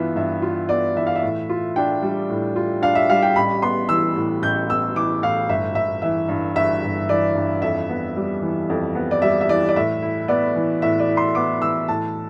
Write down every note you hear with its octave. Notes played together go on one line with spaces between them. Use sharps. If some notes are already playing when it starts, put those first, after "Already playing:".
Already playing: G2 E3 B3 F4 E5
G2 E5
F4
B3 D5
E3 E5
F5
E5
A2
F4
D4 G5
G3
A2
F4
D4 F5
E5
G3 F5
G5
A1 B5
B3 C6
E3 E6
A2
A1 G6
B3 E6
E3 D6
A2 F5
G1 E5
G1 E5
E3 E5
G2
G1 E5
G1
E3 D5
G2
F2 E5
B3
G3
E3
F2
B3
D5
G3 E5
E5
E3 D5
D5
A2 E5
E4
B3 D5
E3
A2 E5
D5
E4
C6
B3 D6
E3 E6
A2 A5